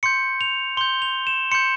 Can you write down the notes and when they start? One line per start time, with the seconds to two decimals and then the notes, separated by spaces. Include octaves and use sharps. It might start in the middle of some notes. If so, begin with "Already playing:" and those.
0.03 C6 G6 C#7
0.41 F7
0.77 C6 G6 G7
1.02 F7
1.27 E7
1.52 C6 G6 C#7